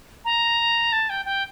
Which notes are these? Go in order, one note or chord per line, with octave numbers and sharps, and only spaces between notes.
A#5
A5
G5
G5